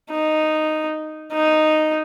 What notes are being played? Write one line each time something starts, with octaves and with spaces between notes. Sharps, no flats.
D#4
D#4